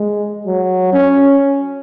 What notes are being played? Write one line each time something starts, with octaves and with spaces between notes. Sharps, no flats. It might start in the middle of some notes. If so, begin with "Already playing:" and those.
Already playing: G#3
F#3
C#4